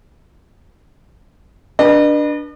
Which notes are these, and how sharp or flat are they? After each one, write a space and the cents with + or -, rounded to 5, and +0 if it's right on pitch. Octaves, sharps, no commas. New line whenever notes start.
D4 +0 B4 -30 D#5 -45